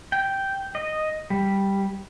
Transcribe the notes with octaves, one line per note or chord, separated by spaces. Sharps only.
G5
D#5
G3